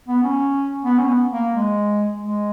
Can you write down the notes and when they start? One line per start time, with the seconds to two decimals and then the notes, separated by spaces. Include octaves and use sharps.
0.08 B3
0.23 C#4
0.85 B3
0.98 C#4
1.08 B3
1.31 A#3
1.54 G#3
2.23 G#3